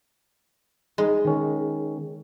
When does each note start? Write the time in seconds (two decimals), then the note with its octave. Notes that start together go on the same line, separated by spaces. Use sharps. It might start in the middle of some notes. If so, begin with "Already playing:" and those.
0.98 G#3 D#4
1.25 D#3 C#4